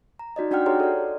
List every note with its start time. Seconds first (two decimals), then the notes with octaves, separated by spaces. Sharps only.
0.19 A#5
0.36 D#4 F#4 D5 D#5
0.51 D4 F#4 D5 F#5 G5 F6
0.66 G4 G#4 C#5 D#5 A#5 C6
0.80 A4 D5